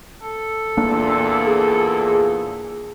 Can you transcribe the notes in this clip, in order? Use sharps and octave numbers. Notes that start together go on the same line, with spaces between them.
A4
E2 A#2 A#3 D4
G#4